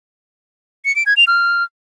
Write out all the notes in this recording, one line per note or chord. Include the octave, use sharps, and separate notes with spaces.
C#7
D7
G#6
F7
F6